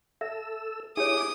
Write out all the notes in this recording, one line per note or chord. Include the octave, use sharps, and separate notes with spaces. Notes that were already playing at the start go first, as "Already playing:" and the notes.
A4 E5 E6
D4 E4 G4 G#4 C#5 D6 D#6